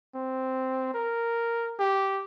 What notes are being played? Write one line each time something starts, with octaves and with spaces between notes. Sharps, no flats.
C4
A#4
G4